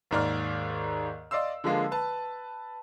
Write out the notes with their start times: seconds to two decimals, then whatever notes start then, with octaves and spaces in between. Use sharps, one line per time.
0.11 D#2 G#2 D5 F6
1.31 D5 D#5 F5 C6 E6
1.64 D3 F3 G#3 A#3
1.91 B4 A5